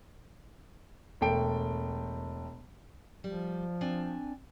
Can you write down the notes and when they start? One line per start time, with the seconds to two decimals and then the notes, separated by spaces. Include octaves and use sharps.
1.21 E1 A3 G5 D7
3.24 F3 G3
3.81 C4 D4 G#5